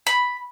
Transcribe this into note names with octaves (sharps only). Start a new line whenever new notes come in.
B5